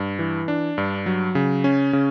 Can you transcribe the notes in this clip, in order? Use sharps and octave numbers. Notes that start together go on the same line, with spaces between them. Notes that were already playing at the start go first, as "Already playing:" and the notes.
Already playing: G2
E3
D4
G2
F#3
C#3
C#4
C#3